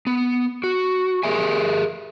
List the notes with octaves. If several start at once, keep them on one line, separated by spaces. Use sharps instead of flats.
B3
F#4
G4 G#4 A#4 E5 G#5